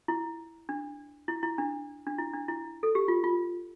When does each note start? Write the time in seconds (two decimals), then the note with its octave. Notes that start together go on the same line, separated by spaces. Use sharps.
0.08 E4
0.69 D4
1.28 E4
1.43 E4
1.58 D4
2.07 D4
2.18 E4
2.33 D4
2.48 E4
2.83 A4
2.95 G4
3.08 F4
3.24 F4